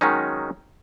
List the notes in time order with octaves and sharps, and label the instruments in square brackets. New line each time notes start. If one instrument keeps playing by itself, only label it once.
[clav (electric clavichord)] D#3 F#3 G#3 C#4 D#4